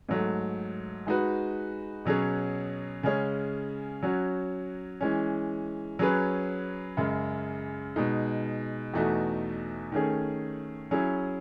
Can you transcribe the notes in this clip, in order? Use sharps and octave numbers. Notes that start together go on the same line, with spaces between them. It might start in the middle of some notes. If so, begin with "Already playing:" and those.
G#2 F#3 A3
G#3 D#4 F#4 B4
B2 F#3 C#4 G#4
C#3 G#3 C#4 G#4 C#5
F#3 C#4 F#4
E3 G#3 C#4
F#3 C#4 G#4 B4
F#2 C#3 G#3
B2 G#3 D#4
E2 B2 A3 D#4 F#4
D#3 A3 C#4 G#4
F#3 C#4 E4 G#4